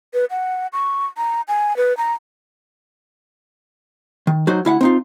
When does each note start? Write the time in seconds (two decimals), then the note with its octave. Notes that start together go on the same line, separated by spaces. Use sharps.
0.14 B4
0.30 F#5
0.73 C#6
1.17 A#5
1.48 G#5
1.77 B4
1.97 A#5
4.27 D#3
4.47 F#3 D#4 F#4 C5
4.65 D2 E4 F5 F#5
4.81 C4 D#4 F4